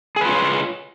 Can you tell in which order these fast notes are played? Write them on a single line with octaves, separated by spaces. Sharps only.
G#4 B4 F4 C#5